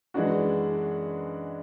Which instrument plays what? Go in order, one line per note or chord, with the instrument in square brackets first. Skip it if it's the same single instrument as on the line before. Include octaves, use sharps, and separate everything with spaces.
[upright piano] F#2 E3 G#3 D4 F#4